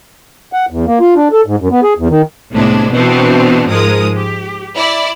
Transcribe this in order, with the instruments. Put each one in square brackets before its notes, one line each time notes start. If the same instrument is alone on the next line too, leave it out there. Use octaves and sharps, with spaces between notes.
[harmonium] F#5
E2
A#3
F4
D4
A4
G#2
F#2
B3
G#4
E2
D#3
[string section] C2 A2 C3 G#3 B3 D4
B2 E3 B3 C4 D4 F#4
G#2 F3 G#3 A#4 D#6
G4
E4 D5